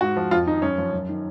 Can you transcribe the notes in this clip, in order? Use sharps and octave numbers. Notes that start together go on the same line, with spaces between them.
G#2 F#4
F3
F2 F4
D#3 D#4
F#2 C#4
F3
F#2
D#3